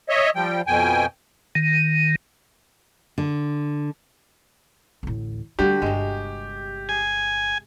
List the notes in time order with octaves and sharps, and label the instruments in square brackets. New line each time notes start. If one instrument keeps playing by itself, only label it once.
[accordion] C#5 D#5 E5
F3 G3 G5
F2 B2 G5 G#5
[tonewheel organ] D#3
[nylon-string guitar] D3
[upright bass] A1 D2
[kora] D3 F#4 [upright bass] G3 A3 [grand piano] G4
[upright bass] G1 [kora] C3 G#3
[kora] G#4 [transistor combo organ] G#5